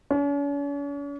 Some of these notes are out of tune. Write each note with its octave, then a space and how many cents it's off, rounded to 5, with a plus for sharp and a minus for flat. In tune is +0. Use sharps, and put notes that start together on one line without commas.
C#4 +45